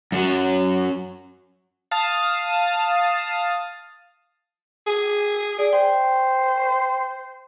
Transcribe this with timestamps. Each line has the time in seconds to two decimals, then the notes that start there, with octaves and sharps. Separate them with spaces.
0.12 F#2 F#3
1.91 F5 A5 D#6
4.87 G#4
5.59 G#4 D5
5.73 C5 G5